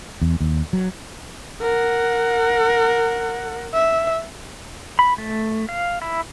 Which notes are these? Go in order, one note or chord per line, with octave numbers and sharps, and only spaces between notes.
E2
D#2
F#3
A#4 F#5
E5
B5
A3
F5
E4